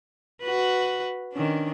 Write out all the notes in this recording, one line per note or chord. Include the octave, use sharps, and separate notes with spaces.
F#4 B4
D#3 C#4 D4